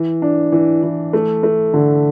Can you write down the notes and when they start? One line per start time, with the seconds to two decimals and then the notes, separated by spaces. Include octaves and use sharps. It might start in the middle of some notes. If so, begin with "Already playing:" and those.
Already playing: E3
0.22 D4
0.52 E3
0.83 E3
1.13 A3
1.43 A3
1.74 D3